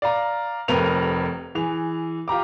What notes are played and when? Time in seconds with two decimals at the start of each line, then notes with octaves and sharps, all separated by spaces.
0.02 D5 F5 A#5
0.68 F1 F2 A#4 B4 F7
1.55 E3 G#4 F7
2.28 F4 G4 A#5 D6